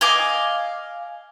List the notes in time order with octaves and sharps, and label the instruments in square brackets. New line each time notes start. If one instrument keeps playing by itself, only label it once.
[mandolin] D#5 F5 G#5 D6